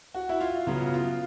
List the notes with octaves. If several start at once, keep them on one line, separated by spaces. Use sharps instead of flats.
F#4
E4
F4
C#3 F#3 B3 F4
F4